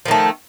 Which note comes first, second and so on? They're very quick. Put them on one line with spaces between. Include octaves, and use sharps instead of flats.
F3 D#3 A3